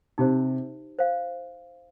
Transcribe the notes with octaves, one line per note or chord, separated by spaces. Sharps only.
C3 D#4 G4 C5
C5 F5